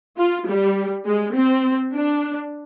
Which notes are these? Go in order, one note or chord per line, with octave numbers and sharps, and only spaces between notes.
F4
G3
G#3
C4
D4